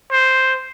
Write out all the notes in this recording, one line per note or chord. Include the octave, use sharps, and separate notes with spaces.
C5